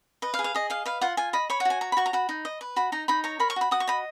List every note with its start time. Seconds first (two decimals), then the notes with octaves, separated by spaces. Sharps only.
0.22 B4 D#5
0.34 F5
0.39 G#4
0.44 F5
0.55 G#4 D#5
0.70 D#5 F5
0.86 B4 F5
1.01 F4 F#5
1.17 F4 G#5
1.33 D#5 B5
1.50 C#5 B5
1.60 F#5
1.65 F#4 G#5
1.81 C#5 A#5
1.92 B5
1.97 F#4 C#6
2.06 A#5
2.13 F#4 B5
2.29 D#4
2.45 D#5
2.61 B4
2.76 F#4 B5
2.92 D#4 A#5
3.08 D#4 B5
3.24 C#5 A#5
3.40 A#4 B5
3.50 C#6
3.56 F#4 B5
3.71 F#4 D#6
3.80 C#6
3.87 D#5 B5